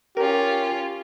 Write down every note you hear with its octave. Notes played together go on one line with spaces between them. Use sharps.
C#4 F4 G4 A#4